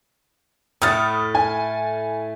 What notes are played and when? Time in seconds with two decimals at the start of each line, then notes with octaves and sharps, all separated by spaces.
0.82 A2 A3 D#6 F6 A6
1.35 G#5